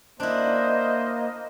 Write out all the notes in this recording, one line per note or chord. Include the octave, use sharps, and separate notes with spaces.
A#3 D4 E4 C5 D#5